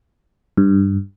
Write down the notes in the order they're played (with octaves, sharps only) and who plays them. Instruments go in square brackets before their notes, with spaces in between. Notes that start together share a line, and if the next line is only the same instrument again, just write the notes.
[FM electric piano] G2